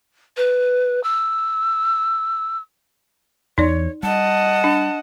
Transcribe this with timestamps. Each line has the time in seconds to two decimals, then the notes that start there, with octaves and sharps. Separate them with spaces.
0.37 B4
1.03 E6
3.58 E2 E3 D#4 C#5 D5
4.03 G3 D#5 F#5 A5
4.64 D4